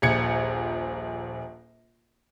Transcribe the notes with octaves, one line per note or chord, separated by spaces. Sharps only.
D#1 A#1 G#6 C#7